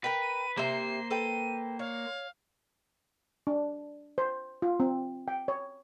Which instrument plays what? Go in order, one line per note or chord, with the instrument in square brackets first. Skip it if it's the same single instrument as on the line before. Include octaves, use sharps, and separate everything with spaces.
[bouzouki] A#4 G5 [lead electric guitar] B4
[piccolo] D#7
[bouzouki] C3 E5 [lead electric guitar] A#3 C5 [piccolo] C7
[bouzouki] A4 B4 G5 [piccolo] D#7
[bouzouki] C#5 [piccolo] F5
[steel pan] D4
C5
F4
C4
G5
C#5